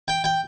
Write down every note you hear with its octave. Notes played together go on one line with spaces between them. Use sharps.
G5
G5